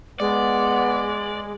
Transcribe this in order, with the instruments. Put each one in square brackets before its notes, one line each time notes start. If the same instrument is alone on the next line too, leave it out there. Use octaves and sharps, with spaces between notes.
[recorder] G#3 [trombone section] B3 [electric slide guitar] D5